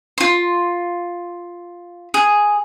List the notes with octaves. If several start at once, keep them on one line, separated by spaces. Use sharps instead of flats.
F4 C6
G#4